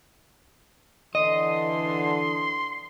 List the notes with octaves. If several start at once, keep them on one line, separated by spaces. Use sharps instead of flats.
D3 E3 D#5 C6